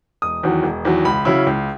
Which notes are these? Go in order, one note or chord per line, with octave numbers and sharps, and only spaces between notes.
E1 D#6
E2 D#3 F#3
E1
E2 D#3 F#3
C#2 B5
C#3 F#3 C#4 E4
C#2